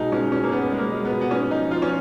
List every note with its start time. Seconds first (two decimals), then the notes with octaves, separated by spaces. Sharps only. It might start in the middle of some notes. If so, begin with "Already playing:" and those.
Already playing: B2 G#3 D#4
0.12 G#3 C#4
0.32 B2 C#4
0.44 A#3
0.52 B2 B3
0.72 G#3
0.78 A#3
0.92 G#3
1.05 B3
1.11 B2
1.21 B3
1.31 G#2 C#4
1.51 F3 D#4
1.71 F3 F4
1.82 C#4